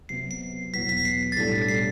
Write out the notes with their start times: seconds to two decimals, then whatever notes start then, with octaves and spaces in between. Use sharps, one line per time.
0.09 C3 F#3 B3 C7
0.31 C7
0.73 E2 B2 F#3 B3 B6
0.89 B6
1.05 C7
1.32 A6
1.36 B1 A2 G3 D4 A4 B6
1.68 C7